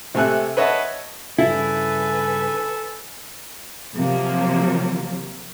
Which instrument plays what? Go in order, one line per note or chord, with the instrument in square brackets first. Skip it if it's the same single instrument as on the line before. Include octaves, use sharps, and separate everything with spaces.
[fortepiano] C3 A3 G#5 F#6
B4 C#5 D#5 E5 F#5 A5
[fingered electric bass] G2 C#3 [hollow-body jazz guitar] E4 [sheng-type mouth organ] A4 [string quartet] B4 G#5
[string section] C3 F3 F#3 A#3